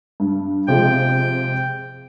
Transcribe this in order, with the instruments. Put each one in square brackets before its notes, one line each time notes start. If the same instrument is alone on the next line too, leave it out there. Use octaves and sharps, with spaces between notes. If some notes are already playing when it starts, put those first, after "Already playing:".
[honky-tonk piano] G2
[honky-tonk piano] C3 F3 G#3 [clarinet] G5